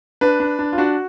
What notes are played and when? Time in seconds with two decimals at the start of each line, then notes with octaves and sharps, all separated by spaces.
0.21 D4 B4
0.40 D4
0.59 D4
0.73 F4
0.78 D4 F#4